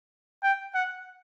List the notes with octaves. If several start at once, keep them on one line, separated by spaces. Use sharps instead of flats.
G5
F#5